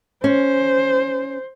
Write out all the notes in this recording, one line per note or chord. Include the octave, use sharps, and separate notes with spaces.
C#4 C5